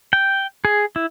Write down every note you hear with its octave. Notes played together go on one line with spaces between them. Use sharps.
G5
G#4
E4